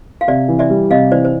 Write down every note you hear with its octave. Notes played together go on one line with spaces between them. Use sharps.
F5
C3 D5 E5
E3
D5 E5
G3
C3 D#5 F5
E3 C5 D5
C5